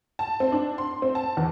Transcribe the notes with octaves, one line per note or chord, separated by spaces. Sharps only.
A5
C4
D4
C6
C4
A5
E2